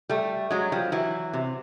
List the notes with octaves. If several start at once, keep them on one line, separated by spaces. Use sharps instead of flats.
G3 A3
F#3 G#3
F3 G3
E3 F#3
C3